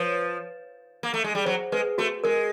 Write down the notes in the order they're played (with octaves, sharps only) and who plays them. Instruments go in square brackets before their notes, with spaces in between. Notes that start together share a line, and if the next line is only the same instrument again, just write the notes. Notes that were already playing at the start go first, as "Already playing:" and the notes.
Already playing: [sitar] F3 [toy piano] B4 C#5
[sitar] A#3
A3
G#3
G3
[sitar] F#3 [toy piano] C5
[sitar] G#3 [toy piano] B4
[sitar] A3 [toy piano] F#4
[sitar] G#3 [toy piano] A#4